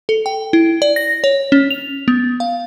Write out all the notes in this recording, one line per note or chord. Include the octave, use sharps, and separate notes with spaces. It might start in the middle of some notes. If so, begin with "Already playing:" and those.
A4
G5
E4
D5
A#6
C#5
C#4
F7
B3
F5